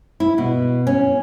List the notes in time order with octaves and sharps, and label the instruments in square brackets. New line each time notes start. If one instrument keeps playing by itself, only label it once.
[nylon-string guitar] E4
B2
C#4